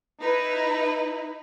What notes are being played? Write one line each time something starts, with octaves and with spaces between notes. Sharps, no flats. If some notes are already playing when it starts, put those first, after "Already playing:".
D#4 E4 B4